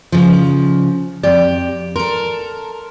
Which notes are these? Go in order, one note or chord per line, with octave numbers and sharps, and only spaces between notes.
C#3 F3
F2 G4 D5
A4 A#4 C6